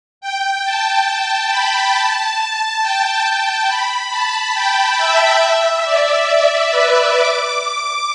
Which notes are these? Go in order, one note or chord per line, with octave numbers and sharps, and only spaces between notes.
G5
A5
A5
B5
A5
G5
A5
B5
A5
G5
E5
E5
D5
B4
D6
D6